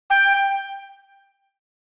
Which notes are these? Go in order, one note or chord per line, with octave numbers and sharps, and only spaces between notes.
G5